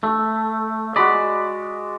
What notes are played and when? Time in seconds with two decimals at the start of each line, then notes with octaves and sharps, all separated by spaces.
0.03 A3
0.96 G#3 F#4 D5 B5